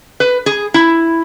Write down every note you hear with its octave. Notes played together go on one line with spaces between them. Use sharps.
B4
G#4
E4